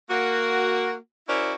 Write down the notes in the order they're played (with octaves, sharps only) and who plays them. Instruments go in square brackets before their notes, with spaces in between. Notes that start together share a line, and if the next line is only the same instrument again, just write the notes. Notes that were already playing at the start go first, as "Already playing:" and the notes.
[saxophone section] A#3 F#4
C#4 E4 F#4 A#4 C5 D5